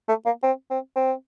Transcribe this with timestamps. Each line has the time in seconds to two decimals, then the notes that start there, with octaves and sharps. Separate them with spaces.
0.08 A3
0.26 A#3
0.43 C4
0.70 C4
0.96 C4